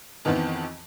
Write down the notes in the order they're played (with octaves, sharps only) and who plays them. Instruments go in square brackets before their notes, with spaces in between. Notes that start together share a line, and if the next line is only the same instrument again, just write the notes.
[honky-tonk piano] F2 D#3 E3 B3 C4